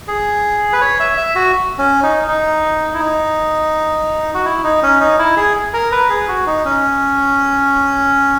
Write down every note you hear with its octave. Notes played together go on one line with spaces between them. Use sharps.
G#4
B4
C#5
E5
E5
F#4
C#4
D#4
D#4
E4
D#4
F#4
E4
D#4
C#4
D#4
E4
G#4
A#4
B4
G#4
F#4
D#4
C#4